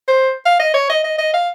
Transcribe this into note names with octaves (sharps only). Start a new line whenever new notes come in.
C5
F5
D#5
C#5
D#5
D#5
D#5
F5